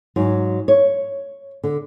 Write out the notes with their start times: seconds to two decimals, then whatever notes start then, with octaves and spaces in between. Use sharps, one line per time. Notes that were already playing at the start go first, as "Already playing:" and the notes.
0.16 G#2 F#3
0.68 C#5
1.63 D3